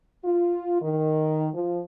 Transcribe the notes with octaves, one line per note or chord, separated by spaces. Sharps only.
F4
D#3
F3